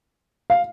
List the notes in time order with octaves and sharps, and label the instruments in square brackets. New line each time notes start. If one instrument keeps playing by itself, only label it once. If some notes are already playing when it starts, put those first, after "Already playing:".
[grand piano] F5